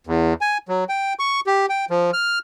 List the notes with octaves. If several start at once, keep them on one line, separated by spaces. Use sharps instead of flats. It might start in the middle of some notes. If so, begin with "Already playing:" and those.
E2
G#5
F#3
G5
C#6
G4
G5
F3
F6